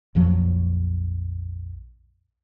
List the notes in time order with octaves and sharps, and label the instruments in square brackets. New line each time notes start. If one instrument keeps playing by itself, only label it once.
[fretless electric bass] A#1 F2 F3 F#3